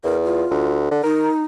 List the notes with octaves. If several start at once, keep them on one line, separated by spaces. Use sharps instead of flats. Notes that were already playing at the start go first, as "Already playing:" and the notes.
E2 A#4
F4
D2
D3
D#4 A#4